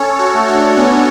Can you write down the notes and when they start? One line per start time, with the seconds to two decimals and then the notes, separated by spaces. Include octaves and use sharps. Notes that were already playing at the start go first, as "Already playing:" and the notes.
Already playing: C#4 A4 C#5
0.19 F#4 A4
0.34 A3
0.48 D4 F#4
0.77 B3 C#4 D4